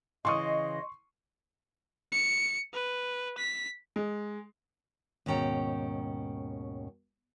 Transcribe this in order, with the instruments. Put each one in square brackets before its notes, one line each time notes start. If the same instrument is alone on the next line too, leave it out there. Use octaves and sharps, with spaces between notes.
[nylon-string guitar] C#3 E3 [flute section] D#5 [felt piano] C6 C#6 D#6
[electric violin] C#7
B4
B6
[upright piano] G#3
[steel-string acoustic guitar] D#2 G#2 B2 C#4 G5 A#5